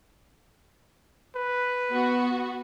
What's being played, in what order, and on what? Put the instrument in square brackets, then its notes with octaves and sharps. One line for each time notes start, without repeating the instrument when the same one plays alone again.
[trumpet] B4
[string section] B3 F#4